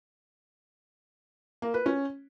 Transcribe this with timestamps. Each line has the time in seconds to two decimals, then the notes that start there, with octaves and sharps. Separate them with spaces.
1.62 A#3
1.74 B4
1.86 C#4